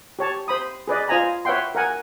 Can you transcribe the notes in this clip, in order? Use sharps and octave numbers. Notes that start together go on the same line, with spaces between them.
G4 C#5 A5
C5 B5 D#6
G#4 B4 D5 D#5
F4 C5 D#5 G#5 A#5 B5
B4 C#5 E5 F#5 G5 C6
A#4 F#5 G#5